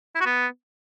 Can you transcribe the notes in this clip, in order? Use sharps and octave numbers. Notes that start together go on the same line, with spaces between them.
E4
F#4
B3